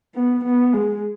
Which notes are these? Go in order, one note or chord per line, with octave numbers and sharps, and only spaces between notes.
B3
B3
G#3